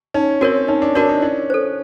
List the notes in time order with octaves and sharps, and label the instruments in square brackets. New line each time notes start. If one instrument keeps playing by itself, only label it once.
[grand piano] C#4 [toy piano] D#4
[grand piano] C4 [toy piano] F#4 A#4 C#5
[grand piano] C#4 [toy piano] D#4
[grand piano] D4
[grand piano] D4 [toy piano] F#4 A#4 C#5
[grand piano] D#4
[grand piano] C#4 [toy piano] E4
[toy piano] A4 C5